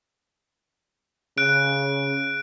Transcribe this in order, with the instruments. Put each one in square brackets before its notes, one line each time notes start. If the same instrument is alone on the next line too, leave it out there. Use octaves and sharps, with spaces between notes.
[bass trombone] C#3 [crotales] F#6 D7